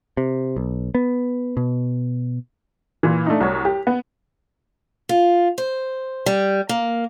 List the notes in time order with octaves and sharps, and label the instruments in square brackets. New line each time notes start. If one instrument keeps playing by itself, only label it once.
[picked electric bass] C3
B1
B3
B2
[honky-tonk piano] A#2 E3
A3 D4 D#4
C2 F#4 C#5
G4
B3
[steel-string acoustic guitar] F4
C5
G3
A#3